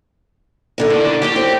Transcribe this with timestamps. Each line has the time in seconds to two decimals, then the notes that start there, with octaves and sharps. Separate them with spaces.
0.78 F#2 D3 D#4
0.90 D3 D#3 D5
1.22 D3 F#3 D4 G4
1.36 C4